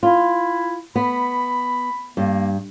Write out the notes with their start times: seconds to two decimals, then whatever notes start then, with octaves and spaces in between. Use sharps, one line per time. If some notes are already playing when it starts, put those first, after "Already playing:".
0.03 E4 F4
0.96 B3 B5
2.17 G2 A#3